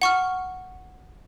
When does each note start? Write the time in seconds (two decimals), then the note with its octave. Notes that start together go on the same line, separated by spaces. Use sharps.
0.02 F#5 C#6 F6